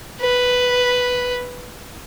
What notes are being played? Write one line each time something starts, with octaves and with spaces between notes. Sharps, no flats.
B4